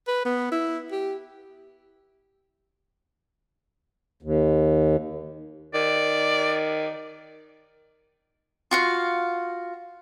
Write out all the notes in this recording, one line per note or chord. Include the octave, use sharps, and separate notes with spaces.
B4
B3
E4
G4
D#2
D#3 D5
F4 F#4 F5